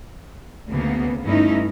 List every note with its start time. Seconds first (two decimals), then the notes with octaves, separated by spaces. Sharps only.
0.69 D2 C#3 A#3 B3
1.25 G2 A3 C#4 D#4 E4